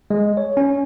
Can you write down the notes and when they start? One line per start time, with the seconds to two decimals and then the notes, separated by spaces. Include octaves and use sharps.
0.10 G#3
0.37 C#5
0.57 C#4